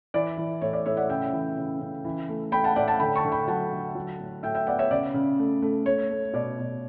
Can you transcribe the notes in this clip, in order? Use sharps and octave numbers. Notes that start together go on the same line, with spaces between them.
E3 D5
E3
A2 C#5
D5
A2 C#5 E5
D5 F#5
C#3 E5 G5
E3
C#3
C#3
E3
A3
A3 G5 B5
F#5 A5
A2 D5 F#5
F#5 A5
D3 G5 B5
A5 C#6
D3
G5 B5
F#3 F#5 A5
D3
F#3
A2
A2 E5 G5
E5 G5
B3 D5 F#5
C#5 E5
C#3 D5
C#3
A3
A3
A3 C#5
A3
B2 D5
B2